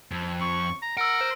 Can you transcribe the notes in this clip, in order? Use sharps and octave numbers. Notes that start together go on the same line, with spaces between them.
F2
C#6
A#5
A#4 F#5 E6 D7
C5